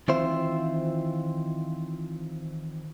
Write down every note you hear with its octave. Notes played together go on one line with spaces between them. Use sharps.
D#3 E3 C4 F4 C5 E5